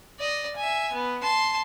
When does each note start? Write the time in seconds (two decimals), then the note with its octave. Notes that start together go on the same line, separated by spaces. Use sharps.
0.20 D5 D#5
0.56 E5 G#5
0.93 B3
1.22 A5 C6